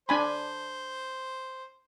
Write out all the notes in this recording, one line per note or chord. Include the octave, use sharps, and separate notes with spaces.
D4 C5 G#5 B5